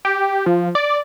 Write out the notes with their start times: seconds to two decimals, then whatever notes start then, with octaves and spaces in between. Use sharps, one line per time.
0.05 G4
0.46 F3
0.75 D5